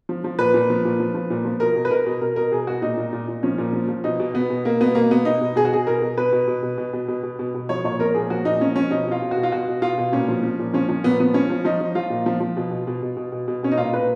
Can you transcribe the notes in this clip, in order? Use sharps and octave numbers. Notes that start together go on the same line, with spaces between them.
F3
F3
A#2 B4
A#2
F3
A#2
F3
F3
A#2
F3
B2 A#4
B2
B4
B2 A#4
B2
B2 A#4
B2 A#4
B2 G#4
B2 F#4
A#2 D#4
A#2
A#2
A#2
F3 C#4
A#2
F3
F3
B2 D#4
B2
B2 B3
B2
B2 A#3
B2 B3
B2 A#3
B2 B3
B2 D#4
B2
B2 G#4
F#4
B2 G#4
B2 A#4
B2
B2 B4
B2
B2
B2
B2
B2
B2
B2
B2
B2
F3 C#5
A#2 C#5
F3 A#4
A#2 G#4
F3 F#4
A#2 D#4
F3 C#4
F3 C#4
B2 D#4
B2 F4
B2
F#4
B2
F4
B2 F#4
B2
B2 F4
B2
A#2 C#4
F3
F3
A#2
F3 C#4
F3 C#4
A#2 B3
F3 B3
F3 C#4
F3
F3 D#4
F3
F3 F4
A#2
F3
F3
B2
B2
B2
B2
B2
B2
B2
B2 C#4
D#4
A#2 F4
A#2 B4